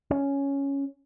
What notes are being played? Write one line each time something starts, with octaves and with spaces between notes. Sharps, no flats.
C#4